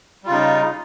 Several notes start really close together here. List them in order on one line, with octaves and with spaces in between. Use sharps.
G3 F4 C#3 D#4